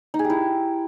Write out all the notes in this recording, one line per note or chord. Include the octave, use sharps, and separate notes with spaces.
D#4
G#4
G4
E4